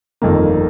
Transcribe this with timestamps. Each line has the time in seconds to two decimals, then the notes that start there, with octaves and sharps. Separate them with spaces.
0.22 G1 F2 D#3 A#3